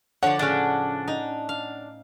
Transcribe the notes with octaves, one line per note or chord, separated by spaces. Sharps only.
D3 F3 C#5 D5 F#5
A2 C#3 C#4 D4
D#4
F5